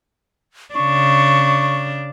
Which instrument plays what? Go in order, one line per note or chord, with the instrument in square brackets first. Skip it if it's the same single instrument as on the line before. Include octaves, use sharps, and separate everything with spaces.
[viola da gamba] C#3 D4 [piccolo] C#6